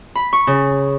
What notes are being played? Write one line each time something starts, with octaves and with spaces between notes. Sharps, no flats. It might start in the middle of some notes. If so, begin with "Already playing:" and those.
B5
C#6
C#3